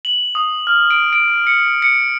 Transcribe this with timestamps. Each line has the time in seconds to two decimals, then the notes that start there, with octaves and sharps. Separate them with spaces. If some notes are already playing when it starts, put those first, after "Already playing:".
0.05 F#7
0.35 D#6
0.67 F6
0.90 D7
1.13 D7
1.47 C#7
1.82 C#7